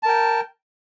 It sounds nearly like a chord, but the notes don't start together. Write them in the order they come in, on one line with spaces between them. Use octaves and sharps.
A5 A#4 G5